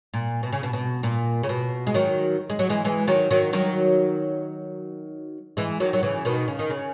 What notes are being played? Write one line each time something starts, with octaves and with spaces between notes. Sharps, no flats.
A#2
B2
C#3
B2
B2
A#2
C#3
B2
G#3
D#3 F#3
G#3
F#3
E3 G#3
E3 G#3
D#3 F#3
D#3 F#3
D#3 F#3
E3 G#3
D#3 F#3
F#3
C#3 E3
B2 D#3
C#3
D#3
C#3